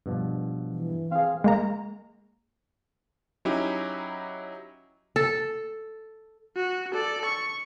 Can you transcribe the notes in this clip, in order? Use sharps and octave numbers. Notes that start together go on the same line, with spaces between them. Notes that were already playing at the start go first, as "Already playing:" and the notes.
G2 B2 F3
E3
C4 G#4 F5
G#3 A#3 A#5
F#3 C#4 D#4 E4 G4
A4
F#4
A4 D5
C#6